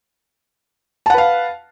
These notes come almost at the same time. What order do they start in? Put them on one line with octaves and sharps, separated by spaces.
A5 F#5 B4 F5